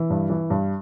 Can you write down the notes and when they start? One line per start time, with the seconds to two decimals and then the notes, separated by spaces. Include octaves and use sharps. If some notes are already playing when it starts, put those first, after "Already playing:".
Already playing: E3
0.10 G2
0.30 E3
0.50 G2